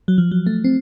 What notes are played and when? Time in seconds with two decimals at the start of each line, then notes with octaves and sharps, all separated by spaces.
0.08 F#3
0.18 F3
0.31 F#3
0.47 A3
0.64 C4